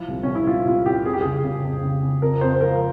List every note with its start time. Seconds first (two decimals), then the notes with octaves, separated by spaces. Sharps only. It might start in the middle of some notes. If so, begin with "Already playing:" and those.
Already playing: F3 E4
0.08 C2
0.23 C2 C#4
0.35 E4
0.47 C2 F4
0.66 C2 F4
0.85 C2 G4
1.05 F2 G#4
1.13 G4
1.21 C#3 G#4
1.44 C#3
1.64 F2
1.83 C#3
2.03 C#3
2.22 F2 A#4
2.41 F2 C5
2.61 F3 A#4